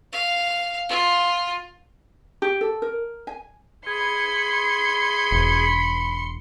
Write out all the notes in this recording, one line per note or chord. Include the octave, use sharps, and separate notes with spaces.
F5
F4
G4
A4
A#4
G#5
G#4 B5 C6 C#7
E1